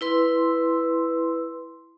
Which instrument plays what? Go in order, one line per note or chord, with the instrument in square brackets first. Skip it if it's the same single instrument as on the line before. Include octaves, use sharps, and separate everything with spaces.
[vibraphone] E4 B4 C6 E6